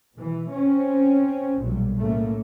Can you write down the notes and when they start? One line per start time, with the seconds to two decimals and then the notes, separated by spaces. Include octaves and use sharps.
0.15 B2 E3
0.52 C4 C#4
1.59 B1 A#2 F#3 G3
1.96 A2 C#3 A3 A#3